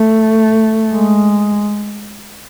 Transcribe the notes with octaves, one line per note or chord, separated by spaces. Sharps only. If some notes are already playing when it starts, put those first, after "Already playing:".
Already playing: A3
G#3